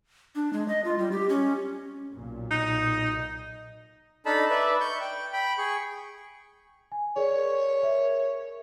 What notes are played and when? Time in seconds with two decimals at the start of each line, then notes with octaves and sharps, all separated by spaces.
0.35 D4
0.53 G#3
0.68 D#5
0.85 F4
0.98 G3
1.12 G4
1.29 C#4
2.13 B1 A#2
2.51 D#4
4.26 D4 D#4 A4 A5 B5
4.50 B4 D5 E5
4.81 C#6 G6
5.01 G5
5.33 G5 B5
5.58 G#4 C#6
6.92 G#5
7.16 G#4 A#4 C#5 D5
7.83 A#4 E5